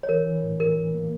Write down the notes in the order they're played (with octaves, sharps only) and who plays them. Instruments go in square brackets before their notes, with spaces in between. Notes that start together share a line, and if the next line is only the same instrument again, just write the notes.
[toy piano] C#5
[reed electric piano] E3 [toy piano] A#4
[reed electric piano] E3
A2
[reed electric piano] E3 [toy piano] A#4
[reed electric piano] E3
A#3